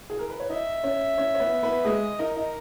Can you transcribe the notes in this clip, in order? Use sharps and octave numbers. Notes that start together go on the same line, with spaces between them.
G#4
A#4
B4
C#5
D#4 D#5 E5
C#4 C#5
C#4 C#5
C#5
B3 B4
B3 B4
G#3 G#4 D#5
D#4 A#4
D#4